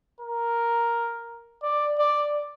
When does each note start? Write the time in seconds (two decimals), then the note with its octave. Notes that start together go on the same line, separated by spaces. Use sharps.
0.21 A#4
1.63 D5
1.98 D5